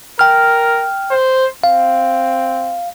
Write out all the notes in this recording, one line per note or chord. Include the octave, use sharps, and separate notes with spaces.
A#4 G5 F6
C5
C4 F5